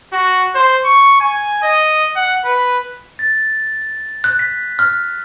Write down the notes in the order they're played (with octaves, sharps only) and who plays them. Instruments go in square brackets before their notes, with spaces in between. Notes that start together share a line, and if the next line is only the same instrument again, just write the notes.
[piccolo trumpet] F#4
C5
C#6
G#5
D#5
F#5
B4
[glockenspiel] A6
F#6
B6
F6